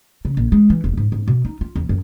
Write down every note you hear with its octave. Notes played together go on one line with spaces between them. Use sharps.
C#3
A#1
G#3
E3
E1
G#2
G#2
B2
D#4
F4
E2
F#2